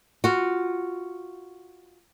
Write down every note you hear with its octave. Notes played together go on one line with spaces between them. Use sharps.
F4 F#4